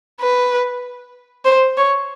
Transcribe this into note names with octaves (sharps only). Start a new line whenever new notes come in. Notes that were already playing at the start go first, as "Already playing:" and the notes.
B4
C5
C#5